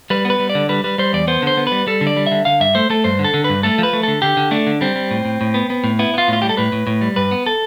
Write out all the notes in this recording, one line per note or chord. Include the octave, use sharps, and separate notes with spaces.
G3 B4
B3
B4
G3
D5
D3
G3 B4
G3 B4
G3 C5
E2 D5
B3 C5
D3 C5
B3
G3 B4
G3 A4
D3
D5
G3
D3 E5
D3 F5
G2 E5
A3 C5
A3 A4
G2 C5
D3
A4
D3
B4
G2
A3 A4
F3 B4
A3
D3 A4
D3 G4
D3
A3 D4
D3
G3 C4
G3
A2
A2
A2
B3
B3
A2
B3 E4
B3 F4
A2 F4
G3 G4
A4
A2 B4
A2
A2
G3
G2 B4
B3
A4